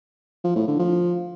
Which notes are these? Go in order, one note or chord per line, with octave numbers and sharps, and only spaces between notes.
F3
A2
D3
F3